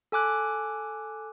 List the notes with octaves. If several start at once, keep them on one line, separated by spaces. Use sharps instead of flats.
A4 G#5 D6 F#6